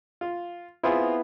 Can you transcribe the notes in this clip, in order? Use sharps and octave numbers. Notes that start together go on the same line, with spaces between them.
F4
B3 C4 E4 F4 G#4